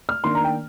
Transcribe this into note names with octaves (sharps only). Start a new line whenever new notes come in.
F6
D#3 A#3 D4 C6
A#5
G5